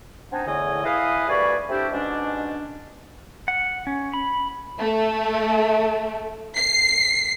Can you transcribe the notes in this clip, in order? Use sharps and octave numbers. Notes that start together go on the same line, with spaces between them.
B3 C4 D4 D#4 G#5 A5
E2 A2 D3 D#5 G#5
E4 G#4 B4 D#5 F5
D2 G2 D5 G#5 B5 C#6
A3 C4 D4 E4 G4
G#2 B2 C#4 D4
F#5
C#4
B5
A3
C7